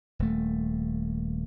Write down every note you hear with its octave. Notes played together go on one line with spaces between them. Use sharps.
D#1 A3